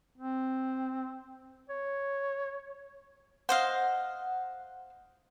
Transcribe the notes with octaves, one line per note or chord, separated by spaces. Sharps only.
C4
C#5
C5 D#5 F5 F#5